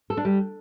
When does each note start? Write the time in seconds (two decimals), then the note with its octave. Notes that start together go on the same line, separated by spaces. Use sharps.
0.10 A4
0.17 D4
0.25 G3